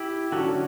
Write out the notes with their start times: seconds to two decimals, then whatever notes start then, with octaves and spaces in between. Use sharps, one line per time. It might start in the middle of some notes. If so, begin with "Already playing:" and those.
Already playing: E4 G4
0.32 D3 F#3 C#4 F#4 A4